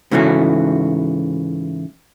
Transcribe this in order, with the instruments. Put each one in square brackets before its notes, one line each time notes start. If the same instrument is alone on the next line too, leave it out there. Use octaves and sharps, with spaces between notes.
[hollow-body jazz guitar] G#2 C#3 E3 A3 F#4